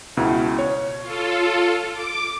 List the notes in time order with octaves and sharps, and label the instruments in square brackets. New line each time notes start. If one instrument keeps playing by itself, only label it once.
[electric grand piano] C#2 B2 E4
C#5
[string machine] F4 A4
D6